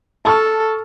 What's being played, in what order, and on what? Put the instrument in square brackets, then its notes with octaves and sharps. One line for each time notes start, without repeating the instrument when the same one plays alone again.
[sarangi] A4 [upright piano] A5 C#6 F6